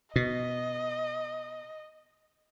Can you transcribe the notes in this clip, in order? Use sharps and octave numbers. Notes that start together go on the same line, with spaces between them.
B2 D#5